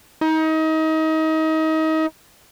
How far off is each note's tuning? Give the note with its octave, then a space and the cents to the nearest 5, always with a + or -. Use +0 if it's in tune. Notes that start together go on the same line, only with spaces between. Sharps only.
D#4 +30